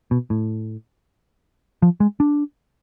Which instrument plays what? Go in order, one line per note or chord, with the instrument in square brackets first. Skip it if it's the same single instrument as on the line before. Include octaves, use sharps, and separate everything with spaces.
[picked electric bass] B2
A2
F3
G#3
D4